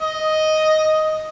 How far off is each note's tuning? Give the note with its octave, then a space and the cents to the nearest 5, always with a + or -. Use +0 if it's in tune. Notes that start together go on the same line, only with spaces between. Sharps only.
D#5 +5